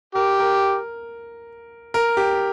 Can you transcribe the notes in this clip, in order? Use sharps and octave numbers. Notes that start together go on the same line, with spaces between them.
G4 A#4
A#4
A#4
G4